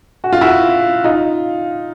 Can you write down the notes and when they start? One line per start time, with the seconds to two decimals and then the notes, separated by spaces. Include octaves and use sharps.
0.24 F#4
0.33 F4
0.41 E4 F#4
1.04 D#4 F4